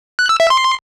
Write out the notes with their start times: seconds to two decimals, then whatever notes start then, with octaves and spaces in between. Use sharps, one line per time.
0.19 F#6
0.29 E6
0.40 E5
0.50 C6